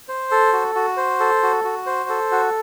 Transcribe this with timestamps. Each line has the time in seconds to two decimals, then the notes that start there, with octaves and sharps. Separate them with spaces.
0.08 C5
0.31 A4
0.53 F#4
0.75 F#4
0.97 C5
1.20 A4
1.43 F#4
1.64 F#4
1.86 C5
2.09 A4
2.32 F#4